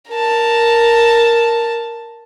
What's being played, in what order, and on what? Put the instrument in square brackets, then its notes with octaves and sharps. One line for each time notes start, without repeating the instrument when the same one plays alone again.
[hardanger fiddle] A#4 A5